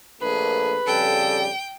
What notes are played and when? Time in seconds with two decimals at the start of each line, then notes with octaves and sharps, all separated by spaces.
0.22 A#1 A3 G#4 A#4 B4
0.87 F2 C#3 G3 A4 G5